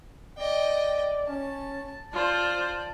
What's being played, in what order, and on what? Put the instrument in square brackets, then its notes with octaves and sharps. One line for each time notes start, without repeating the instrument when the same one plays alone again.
[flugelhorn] D5 [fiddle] D#5 G5
[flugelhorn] C#4 [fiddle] A5
[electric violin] F4 C5 [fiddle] D5 [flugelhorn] A5